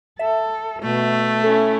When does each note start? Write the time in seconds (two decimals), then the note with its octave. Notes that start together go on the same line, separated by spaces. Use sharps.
0.19 A4 E5
0.83 B2 A3
1.44 C#4 E4 A4